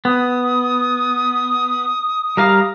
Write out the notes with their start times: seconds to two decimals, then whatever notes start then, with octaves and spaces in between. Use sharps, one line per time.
0.05 B3 D#6
2.37 G3 A#4 F5